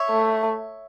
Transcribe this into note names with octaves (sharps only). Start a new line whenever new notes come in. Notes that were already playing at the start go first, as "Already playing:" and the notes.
Already playing: C#5 E5
A3